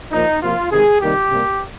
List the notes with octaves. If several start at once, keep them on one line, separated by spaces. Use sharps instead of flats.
A#2 F3 A#3 D#4
C3 F3 A#3 F4
C3 D#3 G#3 G#4
C3 D#3 G3 A#3 G4
C3 G3 A#3